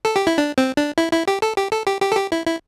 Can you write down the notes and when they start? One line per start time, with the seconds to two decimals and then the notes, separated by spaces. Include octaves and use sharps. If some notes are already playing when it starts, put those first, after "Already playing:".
0.05 A4
0.16 G4
0.27 E4
0.38 D4
0.58 C4
0.77 D4
0.98 E4
1.13 E4
1.27 G4
1.42 A4
1.57 G4
1.72 A4
1.87 G4
2.02 G4
2.12 A4
2.17 G4
2.32 E4
2.46 E4